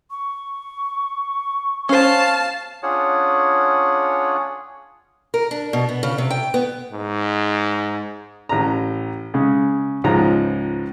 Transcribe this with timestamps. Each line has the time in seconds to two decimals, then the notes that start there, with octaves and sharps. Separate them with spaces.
0.11 C#6
1.89 C#4 C5 F5 A5
2.83 C#4 D4 F4 G#4 C#5 F#5
5.34 A#4
5.51 D4
5.73 B2
5.89 B3
6.03 C#3
6.18 C3
6.30 G5
6.54 B3
6.93 G#2
8.49 A1 A#5
9.34 C#3 G#3
10.04 C#2 G#2 F3 A#5